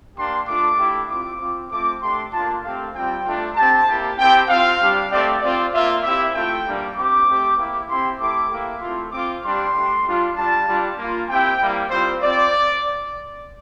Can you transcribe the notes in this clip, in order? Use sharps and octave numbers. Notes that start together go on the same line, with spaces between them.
A#3 D4 G4 C6
A3 D4 F4 D6
A3 E4 G4
C4 F4 D6
C4 F4
A3 C4 F4 D6
A3 D4 G4 C6
A#3 D4 F4 A5
A3 C4 G4 F5
G3 C4 F4 G5
A3 D4 F4
C4 G4 A5
A#3 E4 G4
C4 E4 G4 G5
C4 F4 F5
G3 D4 G4
A3 C4 G4 D5
C4 F4 D5
A#3 F4 E5
C4 E4 G4 E5
A3 C4 F4 G5
G3 A#3 D4
C4 G4 D6
A3 C4 G4
A#3 E4 G4
C4 E4 G4 C6
A3 E4 G4 D6
A#3 E4 G4
A3 C4 F4 C6
C4 F4 D6
G3 D4 G4 C6
A3 D4 G4
G3 D4 F4
G3 D4 F4 A5
G3 D4 F4
A#3 F4
C4 E4 G4 G5
G3 A#3 E4
G3 C4 F4 C5
C4 F4 D5